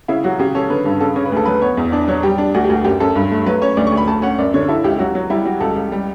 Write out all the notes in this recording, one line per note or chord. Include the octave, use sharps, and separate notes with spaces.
C#3 E4
F#3 F#4
C#3 G4
C#4 A4
D3 B4
G2 A4
C#3 A4
C#3 C#5
B4
D2 A4
F#3 B4
B3 C#5
E2
D4 D5
F#3 C#5
G3 G4
D4
D2 F#4
G4
D2 F#4
F#2 G4
F#2 A4
G2
A3
F#3 B4
C#4 C#5
D2 D5
C#6
D2
B5
D2 A5
C#4 F#5
F#2 D5
D3 C#5
E4 A4
C#2 G4
F#3 F#4
F#3
G3 E4
G3 F#4
C#2 A4
C#2
G3